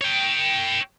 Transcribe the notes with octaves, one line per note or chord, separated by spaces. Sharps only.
C#5 G5